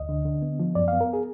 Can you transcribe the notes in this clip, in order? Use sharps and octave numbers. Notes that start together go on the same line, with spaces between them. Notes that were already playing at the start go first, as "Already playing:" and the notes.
Already playing: D2 D#5
D3
D3
B3
F3
F#2 D5
B3 F5
A#4
G#4